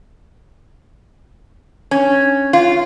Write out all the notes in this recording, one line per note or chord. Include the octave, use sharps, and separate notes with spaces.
C#4
F4